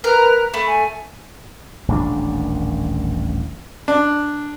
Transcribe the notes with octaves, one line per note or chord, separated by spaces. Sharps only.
A#4 B4
A3 B5
G#5
D#1 A1 D4
D4